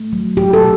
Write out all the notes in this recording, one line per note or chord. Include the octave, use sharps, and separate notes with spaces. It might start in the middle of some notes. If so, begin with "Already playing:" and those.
Already playing: A3
F#3
F#3 G4
A4
B2